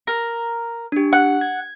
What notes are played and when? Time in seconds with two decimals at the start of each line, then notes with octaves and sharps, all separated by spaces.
0.07 A#4
0.92 D4 G4
1.13 F#5
1.41 G#6